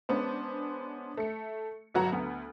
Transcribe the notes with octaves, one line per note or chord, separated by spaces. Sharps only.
G#3 B3 C#4 D4 C5
A3 C#7
G1 F#3 F#4 B4 A#5
D2 B3